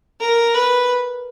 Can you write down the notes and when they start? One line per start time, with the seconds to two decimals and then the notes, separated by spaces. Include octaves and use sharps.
0.21 A#4
0.54 B4